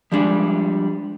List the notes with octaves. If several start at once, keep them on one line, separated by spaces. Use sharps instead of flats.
F3 G3 G#3 D4